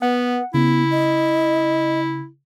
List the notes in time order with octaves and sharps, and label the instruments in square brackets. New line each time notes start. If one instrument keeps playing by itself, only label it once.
[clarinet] B3 [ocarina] B4 [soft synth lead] F#5
[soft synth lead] C#3 [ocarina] B3 [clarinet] E4
[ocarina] D#5